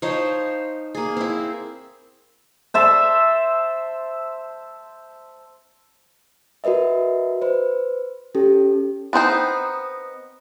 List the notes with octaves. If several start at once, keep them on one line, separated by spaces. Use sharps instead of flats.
F3 D#4 C5 C#5
A#3 G#4
C4 E4
C5 E5 A5
F#4 A#4 B4 D#5 E5
B4 C5
C#4 G4 A4
B3 C4 D#4 C5